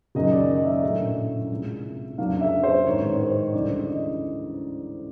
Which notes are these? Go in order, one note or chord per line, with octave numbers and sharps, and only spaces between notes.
F#1 F#2 D#3 F#3 D#5
D5
D#5
E5
A#1 A2 F#3 A3 C#4
C2 C3 F3 G#3
F2 C#3 F#3 A#3 D4 F5
E5
C5
A1 G#2 D#3 C#5
C5
D2 C#3 E3 G3 D5
D#5